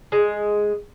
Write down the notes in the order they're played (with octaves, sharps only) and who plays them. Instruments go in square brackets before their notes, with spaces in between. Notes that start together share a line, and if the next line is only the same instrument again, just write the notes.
[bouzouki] G#3